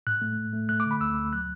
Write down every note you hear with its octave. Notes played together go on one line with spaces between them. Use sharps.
A2 F#6
A3
A2
A3
A3 F#6
D6
D3
B5
D2 E6
D2
F#3 F#6